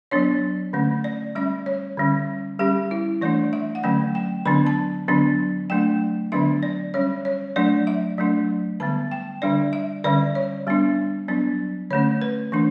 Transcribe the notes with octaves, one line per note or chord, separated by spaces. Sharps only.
F#3 B3 D4 C#5
D3 A3 C#4
D5
G3 C#4 E5
C#5
D3 G3 C#4
G3 C#4 G4
E4
E3 A3 D4 D5
E5
F#5
D3 F#3 A3 C#4 G5
G5
D3 F#3 B3 D4 B5
A5
D3 F#3 B3 D4
F#3 A3 D4 G5
D3 F#3 B3 D4 E5
D5
G3 C#4 C#5
C#5
F#3 A3 D4 D5
E5
F#3 A3 D4
D3 G3 B3 A5
G5
D3 G3 D4 D5
E5
D3 G3 C#4 D5
C#5
G3 B3 D4
F#3 B3 D4
D3 A3 C#4 C#5
B4
E3 A3 D4